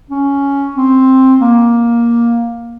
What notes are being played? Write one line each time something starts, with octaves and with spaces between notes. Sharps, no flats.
C#4
C4
A#3